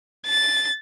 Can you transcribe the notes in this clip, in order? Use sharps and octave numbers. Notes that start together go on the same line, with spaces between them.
A6